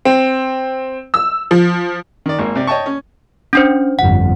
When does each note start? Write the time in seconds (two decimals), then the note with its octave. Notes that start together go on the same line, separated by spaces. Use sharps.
0.05 C4
1.14 E6
1.51 F3
2.26 D#3 D5
2.39 G#1 A#3
2.56 C3 D5
2.67 C#5 D#5 G5 A5 C#6
2.86 C#4
3.53 C#4 D4 C5
3.99 G1 F2 F#5